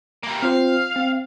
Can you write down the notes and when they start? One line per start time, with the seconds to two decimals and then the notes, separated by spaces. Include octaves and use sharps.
0.23 G3 A#3
0.42 C4 F4 C5 F5
0.96 C4